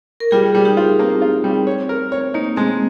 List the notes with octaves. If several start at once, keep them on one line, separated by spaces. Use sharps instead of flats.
A#4
G3 F4 G#4
G3
D#4 G4
F4
A#3 C4
F4
G3
C#5
A#4
C#5
A#3 D#4
G#3 C4